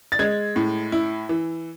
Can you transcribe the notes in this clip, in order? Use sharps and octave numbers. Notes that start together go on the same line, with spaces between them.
A6
G#3 G#6
A2
E4
E3